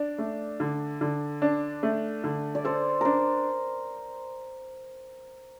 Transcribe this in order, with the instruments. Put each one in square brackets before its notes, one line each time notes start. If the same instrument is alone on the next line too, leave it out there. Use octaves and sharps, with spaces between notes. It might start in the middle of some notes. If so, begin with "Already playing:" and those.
Already playing: [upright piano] D4 [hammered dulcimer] D5
[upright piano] A3
D3
D3
D4
A3
D3
[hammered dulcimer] D5
[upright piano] A4 [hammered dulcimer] C5
[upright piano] D4 [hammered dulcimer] A#4 C5